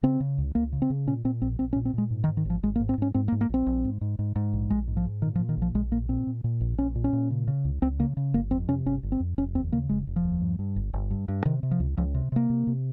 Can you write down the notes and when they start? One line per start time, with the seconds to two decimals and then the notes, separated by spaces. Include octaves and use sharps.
0.03 C#3 C4
0.20 C#3
0.38 C#2
0.55 C#2 A#3
0.73 C#3
0.82 C4
0.90 C#3
1.07 A#2 C#4
1.24 A#2 C4
1.42 A#1 C4
1.59 A#1 C4
1.73 C#4
1.76 A#2
1.85 C4
1.94 A#2 G#3
2.11 G#2
2.24 D#3
2.28 G#2
2.37 D#3
2.45 G#1 F3
2.63 G#1 G#3
2.76 A#3
2.80 G#2
2.89 C4
2.98 G#2 C#4
3.14 G#2 C4
3.28 A#3
3.32 G#2
3.41 A#3
3.49 A#1 C4
3.66 A#1
3.84 G#2
4.01 G#2
4.19 G#2
4.36 G#2
4.53 A#1
4.70 A#1 G#3
4.88 G#2
4.97 F3
5.05 G#2
5.22 A#2 D#3
5.36 F3
5.39 A#2
5.49 D#3
5.57 A#1 F3
5.75 A#1 G#3
5.92 A#2 A#3
6.09 A#2 C4
6.27 A#2
6.44 A#2
6.61 A#1
6.78 A#1 C#4
6.95 A#2
7.04 C#4
7.13 A#2
7.30 C#3
7.48 C#3
7.65 C#2
7.82 C#2 C4
7.99 C#3 A#3
8.17 C#3
8.34 G1 A#3
8.51 F2 C4
8.68 C3 C#4
8.86 G1 C#4
9.03 G1
9.12 C4
9.20 F2
9.38 F1 C#4
9.55 D#2 C4
9.72 C#3 A#3
9.89 F1 G#3
10.07 F1
10.16 F3
10.24 D#2
10.42 G2
10.59 G2
10.76 G1
10.93 G1
11.11 G2
11.28 G2
11.45 C3 D#3
11.63 C3
11.71 F3
11.80 C#2
11.97 C#2 F3
12.14 C3
12.32 C3 A#3
12.50 C3
12.67 C3